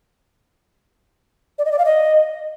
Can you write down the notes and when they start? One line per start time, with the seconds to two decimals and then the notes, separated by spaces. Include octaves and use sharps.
1.58 D5
1.65 D#5
1.72 D5
1.78 F5
1.85 D#5